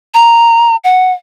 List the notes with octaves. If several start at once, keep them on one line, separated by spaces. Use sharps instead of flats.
A#5
F#5